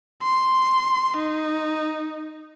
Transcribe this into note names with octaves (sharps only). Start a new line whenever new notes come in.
C6
D#4